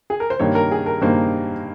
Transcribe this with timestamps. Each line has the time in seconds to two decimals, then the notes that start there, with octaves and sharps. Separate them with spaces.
0.10 G#4
0.20 A#4
0.30 C5
0.39 G2 D#3 A#3 C#5
0.55 A#4
0.71 G#4
0.86 A#4
1.02 G2 D#3 A#3 C5